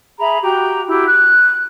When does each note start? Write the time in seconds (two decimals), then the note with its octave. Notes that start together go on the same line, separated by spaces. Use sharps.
0.19 G#4 E5 A#5 B5
0.42 F#4 G4 G5 A#5
0.87 E4 F#4 G4
1.07 F#6